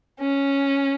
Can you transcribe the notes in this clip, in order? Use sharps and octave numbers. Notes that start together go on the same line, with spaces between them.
C#4